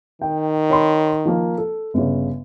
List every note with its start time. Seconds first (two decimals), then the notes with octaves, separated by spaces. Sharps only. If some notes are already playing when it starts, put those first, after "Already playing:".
0.22 D#3 G5
0.70 C#5 B5 C6
1.25 F3 A#3
1.58 A4
1.94 G1 C#3